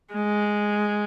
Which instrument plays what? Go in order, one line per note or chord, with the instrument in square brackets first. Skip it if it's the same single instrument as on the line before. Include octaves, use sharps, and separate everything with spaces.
[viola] G#3